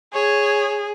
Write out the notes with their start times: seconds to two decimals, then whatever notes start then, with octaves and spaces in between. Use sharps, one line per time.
0.14 G#4 C#5